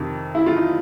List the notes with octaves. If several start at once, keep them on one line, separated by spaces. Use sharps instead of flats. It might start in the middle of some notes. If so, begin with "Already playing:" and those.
Already playing: F2 C3 D#3
E4
F4
D#4